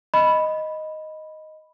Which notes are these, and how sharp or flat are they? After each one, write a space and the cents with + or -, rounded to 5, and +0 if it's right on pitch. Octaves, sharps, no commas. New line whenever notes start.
D#5 +0 B5 +0